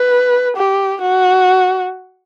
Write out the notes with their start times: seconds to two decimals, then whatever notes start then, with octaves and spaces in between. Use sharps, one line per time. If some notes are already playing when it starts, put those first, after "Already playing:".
Already playing: B4
0.57 G4
1.01 F#4